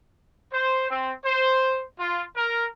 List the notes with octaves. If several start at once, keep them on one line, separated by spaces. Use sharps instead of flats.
C5
C4
C5
F4
A#4